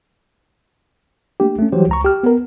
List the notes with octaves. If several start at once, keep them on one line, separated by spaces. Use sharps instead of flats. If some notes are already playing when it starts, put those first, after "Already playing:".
A3 A#3 D4 G4
A3 C#4
E3 F#3 G3 G4 C5
C#2 A#5 C#6
G4 F6
B3 A#4